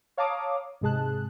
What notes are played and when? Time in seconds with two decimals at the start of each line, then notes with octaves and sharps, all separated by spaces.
0.17 C#5 F5 A5 A#5 D6 D#6
0.81 G#2 C3 G#3 G#4 A5 F#6